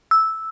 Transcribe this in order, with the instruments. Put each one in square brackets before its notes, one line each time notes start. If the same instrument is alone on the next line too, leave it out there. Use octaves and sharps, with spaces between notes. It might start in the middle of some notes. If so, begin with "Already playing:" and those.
[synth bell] E6